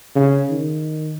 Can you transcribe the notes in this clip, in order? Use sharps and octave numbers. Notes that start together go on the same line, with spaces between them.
C#3
D#3